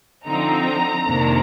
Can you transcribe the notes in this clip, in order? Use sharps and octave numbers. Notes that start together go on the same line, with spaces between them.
D3 F3 C4 D#4 A#5
F2 C3 D#3 A#3 D4